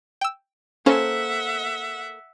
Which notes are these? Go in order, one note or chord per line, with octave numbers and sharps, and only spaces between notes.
G5 E6
A#3 C#4 A4 C5 E5 F#5